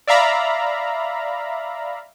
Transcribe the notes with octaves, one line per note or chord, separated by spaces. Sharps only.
D5 E5 F5 A#5 B5